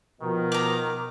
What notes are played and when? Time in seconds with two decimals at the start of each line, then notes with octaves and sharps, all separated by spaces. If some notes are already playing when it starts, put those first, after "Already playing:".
0.22 B2 D#3 F3 A#4
0.52 A#5 D6